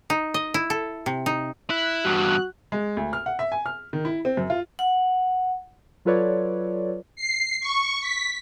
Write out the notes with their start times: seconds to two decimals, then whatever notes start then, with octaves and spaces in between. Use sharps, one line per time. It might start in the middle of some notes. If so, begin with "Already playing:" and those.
0.10 D#4
0.34 D#5
0.54 E4
0.70 A4
1.06 C3
1.26 D#4
1.70 E4 F#6
2.05 E2 G2 F#4
2.72 G#3
2.97 D2
3.13 F6
3.26 F#5
3.39 E5
3.52 G#5
3.66 F6
3.93 D#3
4.05 E4
4.25 C4
4.37 F#2
4.50 F4
4.79 F#5
6.05 F#3 F4 A4 B4 C#5 D5
7.16 C7
7.61 C#6
8.01 B6